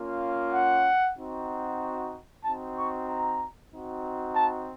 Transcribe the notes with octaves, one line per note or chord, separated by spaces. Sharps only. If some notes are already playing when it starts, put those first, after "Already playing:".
Already playing: A#3 C#4 F4
F#5
C4 D#4 F#4
C4 D#4 F#4 A5
C#6
A#5
C4 D#4 F#4
A5